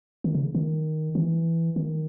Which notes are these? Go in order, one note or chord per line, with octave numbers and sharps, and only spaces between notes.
D#3
C#3
D#3
E3
D#3